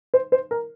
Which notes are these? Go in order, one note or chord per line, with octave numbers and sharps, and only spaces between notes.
C5
C5
A#4